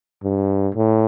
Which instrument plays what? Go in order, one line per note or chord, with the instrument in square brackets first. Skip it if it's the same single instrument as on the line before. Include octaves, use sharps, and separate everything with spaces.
[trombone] G2
A2